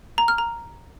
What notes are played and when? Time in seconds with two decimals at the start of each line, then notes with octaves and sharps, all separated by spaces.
0.18 A#5
0.28 F6
0.38 A#5